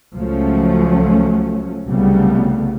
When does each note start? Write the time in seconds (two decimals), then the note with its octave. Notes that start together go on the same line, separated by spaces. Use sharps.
0.16 C#2 F3 F#3 A3 C#4
1.88 C2 C#3 F#3 G3 A3 B3